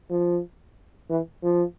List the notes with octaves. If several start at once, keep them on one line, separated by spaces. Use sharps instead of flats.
F3
E3
F3